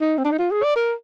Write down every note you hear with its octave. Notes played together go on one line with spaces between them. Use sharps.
D#4
C4
D4
D#4
F4
G#4
D5
A#4